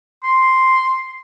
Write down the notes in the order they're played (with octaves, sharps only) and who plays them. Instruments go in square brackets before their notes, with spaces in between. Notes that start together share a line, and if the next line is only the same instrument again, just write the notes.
[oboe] C6